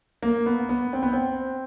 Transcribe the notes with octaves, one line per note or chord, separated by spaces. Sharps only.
A#3
B3
B3
C4
B3
C4